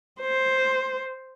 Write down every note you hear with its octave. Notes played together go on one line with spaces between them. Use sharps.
C5